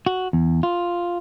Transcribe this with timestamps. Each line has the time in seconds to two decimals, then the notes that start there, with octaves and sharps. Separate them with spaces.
0.06 F#4
0.33 E2
0.63 F4